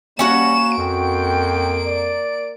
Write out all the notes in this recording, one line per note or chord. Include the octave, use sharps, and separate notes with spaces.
G3 A#3 C#4 F#4 F#5 E7
F2 A#3 G5 D7
D5